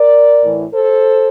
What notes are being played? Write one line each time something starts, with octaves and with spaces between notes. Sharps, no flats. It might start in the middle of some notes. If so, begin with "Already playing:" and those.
Already playing: A#4 D5
A2 E3
A4 C5